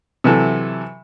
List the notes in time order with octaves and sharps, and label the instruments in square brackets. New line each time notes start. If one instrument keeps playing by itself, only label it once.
[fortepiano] C3 E3 F#3 A4